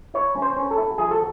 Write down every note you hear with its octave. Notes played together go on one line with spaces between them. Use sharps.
E4 C#5
C#4
C5
C#4
A4
E4
F3 G#4
A4